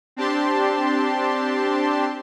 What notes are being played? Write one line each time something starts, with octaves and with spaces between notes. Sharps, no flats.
C4 D4 G4 A5 C6